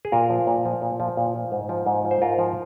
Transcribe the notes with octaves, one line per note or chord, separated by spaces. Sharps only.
G#4
A#2 F4 A#4
F3
A#2
F3
A#2
F3
A#2
F3
G#2
F3
G#2
F3
C5
G#2 F4 A#4
F3